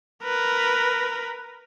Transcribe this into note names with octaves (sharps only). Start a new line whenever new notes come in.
A#4 B4